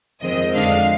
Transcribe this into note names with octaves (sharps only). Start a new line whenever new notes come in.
F2 D#3 G#3 C4 D#5
F2 D3 G#3 D4 F5